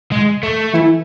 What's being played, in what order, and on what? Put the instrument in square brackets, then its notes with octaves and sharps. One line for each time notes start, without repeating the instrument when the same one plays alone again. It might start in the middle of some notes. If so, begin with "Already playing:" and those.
[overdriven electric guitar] G#3
A3
[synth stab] E3 E4